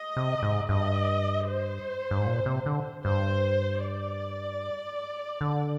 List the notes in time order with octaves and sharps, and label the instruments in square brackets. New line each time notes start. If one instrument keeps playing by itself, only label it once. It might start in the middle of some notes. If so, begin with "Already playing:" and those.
Already playing: [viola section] D#5
[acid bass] C3
G#2
[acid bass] G2 [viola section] D#5
[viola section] C5
[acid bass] G2
G#2
A#2
C3
D3
[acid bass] G2 [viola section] C5
[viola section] D5
[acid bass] D3